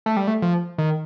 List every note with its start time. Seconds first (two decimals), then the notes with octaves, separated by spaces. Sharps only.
0.06 A3
0.17 G3
0.27 A3
0.42 F3
0.78 D#3